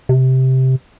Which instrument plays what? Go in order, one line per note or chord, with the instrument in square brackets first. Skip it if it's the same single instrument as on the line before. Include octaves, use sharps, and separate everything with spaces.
[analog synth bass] C3